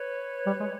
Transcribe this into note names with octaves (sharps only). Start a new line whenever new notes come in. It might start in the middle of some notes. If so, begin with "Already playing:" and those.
Already playing: B4 C#5
G3
G#3